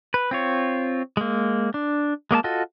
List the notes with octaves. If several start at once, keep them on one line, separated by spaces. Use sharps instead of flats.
B4
C4 F4 C#5
G#3 A#3
D4
G#3 A#3 D#5 A5
F4 F#4 A4 D#5